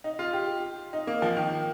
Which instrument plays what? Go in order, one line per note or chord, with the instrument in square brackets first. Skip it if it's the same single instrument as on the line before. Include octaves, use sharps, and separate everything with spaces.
[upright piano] D#4
F4
G4
D#4
A#3
F3
D#3